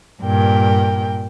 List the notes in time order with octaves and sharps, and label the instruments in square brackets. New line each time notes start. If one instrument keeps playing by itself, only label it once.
[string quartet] G2 A#2 A#4 G5